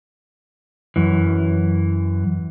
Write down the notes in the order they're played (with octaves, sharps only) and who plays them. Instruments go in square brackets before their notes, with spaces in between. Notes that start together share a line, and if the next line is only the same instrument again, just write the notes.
[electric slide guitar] F#2 E3